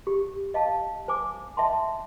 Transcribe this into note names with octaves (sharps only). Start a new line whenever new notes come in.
G4
D#5 F5 A5
C5 G#5 D6
D#5 E5 G5 A5 C6